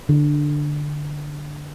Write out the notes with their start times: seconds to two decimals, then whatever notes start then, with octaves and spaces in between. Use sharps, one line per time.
0.09 D3